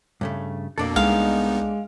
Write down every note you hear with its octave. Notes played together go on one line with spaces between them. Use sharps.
G2 C#3 A3
F2 B2 A#3 D4 A4
C2 G#3 B3 D#4 F5